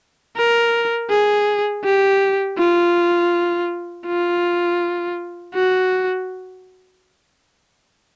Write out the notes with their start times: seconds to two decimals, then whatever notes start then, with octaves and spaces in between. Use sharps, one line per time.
0.36 A#4
1.10 G#4
1.84 G4
2.58 F4
4.07 F4
5.55 F#4